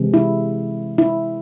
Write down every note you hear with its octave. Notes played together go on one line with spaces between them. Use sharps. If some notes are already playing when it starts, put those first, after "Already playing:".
Already playing: C3 E3 G#3
E4
E4